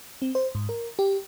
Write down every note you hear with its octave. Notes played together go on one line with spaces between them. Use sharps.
C4
C5
G#2
A#4
G4